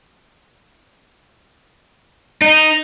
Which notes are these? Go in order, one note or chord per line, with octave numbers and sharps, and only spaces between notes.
D#4